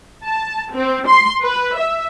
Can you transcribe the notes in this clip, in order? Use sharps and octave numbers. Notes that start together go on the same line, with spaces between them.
A5
C4
C6
B4
E5